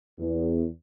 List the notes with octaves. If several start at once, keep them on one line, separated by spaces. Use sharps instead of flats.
E2